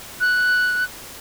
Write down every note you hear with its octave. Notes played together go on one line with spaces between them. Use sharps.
F#6